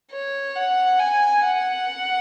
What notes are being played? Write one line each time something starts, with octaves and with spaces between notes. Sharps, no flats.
C#5
F#5
G#5
F#5